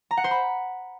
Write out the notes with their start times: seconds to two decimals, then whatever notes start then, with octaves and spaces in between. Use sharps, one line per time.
0.11 A#5
0.17 F#5
0.24 C5
0.31 B5